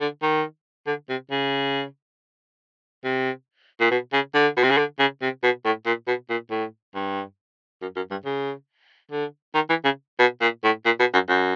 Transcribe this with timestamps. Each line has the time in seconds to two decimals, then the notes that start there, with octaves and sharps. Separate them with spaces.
0.01 D3
0.22 D#3
0.87 D3
1.09 C3
1.31 C#3
3.04 C3
3.80 A#2
3.91 B2
4.13 C#3
4.34 D3
4.57 B2
4.64 C3
4.70 C#3
4.77 D3
4.99 C#3
5.22 C3
5.43 B2
5.65 A2
5.86 A#2
6.07 B2
6.30 A#2
6.51 A2
6.95 G2
7.82 F#2
7.96 F#2
8.11 G2
8.25 C#3
9.11 D3
9.54 D#3
9.69 E3
9.84 C#3
10.19 B2
10.41 A#2
10.64 A2
10.85 A#2
10.99 B2
11.14 F#2
11.29 F#2